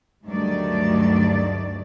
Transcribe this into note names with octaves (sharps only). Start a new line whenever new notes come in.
D2 G2 D#3 F#3 A3 D5